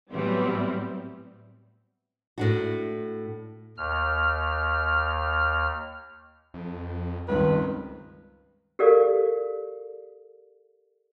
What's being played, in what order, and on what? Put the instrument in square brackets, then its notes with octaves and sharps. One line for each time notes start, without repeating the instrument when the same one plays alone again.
[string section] A2 E3 F#3 G3 B3 C4
[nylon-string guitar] A2 D4 F#4
[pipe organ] D#2 F6
[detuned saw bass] F2
[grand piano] C#2 G2 C4 [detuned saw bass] D#3 [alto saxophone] B4
[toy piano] G4 A4 A#4 D5 F5